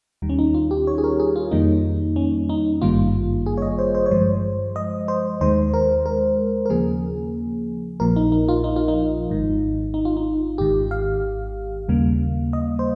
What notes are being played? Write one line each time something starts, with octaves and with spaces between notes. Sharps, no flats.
D#2 D#3 G3
C#4
D#4
F4
G4
C#5
G#4
A#4
G#4
F4
F2 D#3 G3 A#3 D#4
C#4
D#4
G#1 G2 D#3 G3 A#3 F4
G#4
C#5
D#5
C5
C5
C#5
G2 F3 G#3 C5
D#5
C5
D#2 D#3 G#3 C5
A#4
A#4
A#4
D#2 C#3 F3 A#3 G#4
A#1 A#2 F3 A#4
D#4
D#4
F4
D#4
F4
D#4
G#1 G#2 D#3
D#4
F4
D#4
G#1 G#2 D#3 G4
F5
D#2 C#3 G3 A#3
D#5
C5